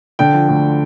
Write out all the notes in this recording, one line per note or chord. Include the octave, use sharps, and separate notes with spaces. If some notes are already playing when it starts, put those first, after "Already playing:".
D3 G5
F3
D2